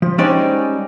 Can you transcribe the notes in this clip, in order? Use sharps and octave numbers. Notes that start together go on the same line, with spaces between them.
F3
G3 G#3 C#4 D#4 C5 D5